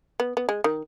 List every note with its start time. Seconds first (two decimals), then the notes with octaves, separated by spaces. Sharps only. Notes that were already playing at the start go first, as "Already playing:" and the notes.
0.20 B3
0.37 B3
0.49 G#3
0.64 D#3